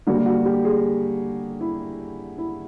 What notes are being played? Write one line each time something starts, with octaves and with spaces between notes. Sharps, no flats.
D3 G3 A#3 F#4
F#4
G4
G#4
E4
E4